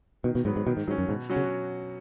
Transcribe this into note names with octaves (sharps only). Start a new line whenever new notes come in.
B2 D#3
B2
G#2 F#3 B3
G#2
B2 D#3
G#2
G#2 F#3 C#4
F#2
G#2 B2
F#3 C#4 F#4
C#3